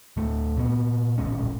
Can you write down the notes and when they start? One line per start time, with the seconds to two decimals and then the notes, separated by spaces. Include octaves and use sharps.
0.17 D1 A3
0.57 A#2 B3
1.18 D#1 A1 G#3 C#4